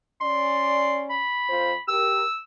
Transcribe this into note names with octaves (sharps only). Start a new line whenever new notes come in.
C#4 D5 C6
B5
F2 F4 C5
G4 A#4 E6